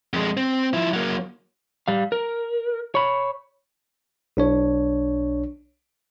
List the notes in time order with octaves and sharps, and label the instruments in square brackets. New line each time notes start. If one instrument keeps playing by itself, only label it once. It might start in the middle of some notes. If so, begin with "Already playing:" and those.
[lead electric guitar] F2 G#3
C4
F3 E4
F#3 A#3
G3 F5
A#4
C#5 B5
[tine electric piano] B1 D4 C#5